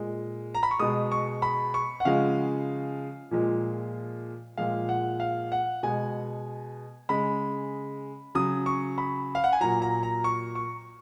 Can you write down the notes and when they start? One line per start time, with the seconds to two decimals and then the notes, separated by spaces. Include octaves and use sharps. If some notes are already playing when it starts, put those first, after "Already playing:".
Already playing: A#2 G#3
0.55 A#5
0.63 B5
0.71 C#6
0.79 B2 G#3 D#6
1.12 C#6
1.42 B5
1.74 C#6
2.00 F#5
2.05 C#3 F3 G#3 F5
3.31 A#2 F3 G#3
4.57 A#2 F3 G#3 F5
4.89 F#5
5.20 F5
5.52 F#5
5.83 B2 G#3 G#5
7.09 C#3 G#3 B5
8.35 C#3 F#3 D#6
8.66 C#6
8.98 B5
9.35 F5
9.44 F#5
9.53 G#5
9.61 A#2 F#3 A#5
9.82 A#5
10.03 A#5
10.24 C#6
10.55 C#6